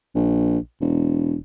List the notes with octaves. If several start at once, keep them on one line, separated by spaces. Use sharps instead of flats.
A#1
E1